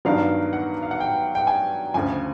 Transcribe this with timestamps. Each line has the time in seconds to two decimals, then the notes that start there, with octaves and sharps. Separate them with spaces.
0.05 G2 D#3 F#3 B3 D4 F5
0.53 F#5
0.82 F5
0.91 F#5
1.00 G5
1.35 G5
1.47 G#5
1.94 D2 C#3 F3 G#5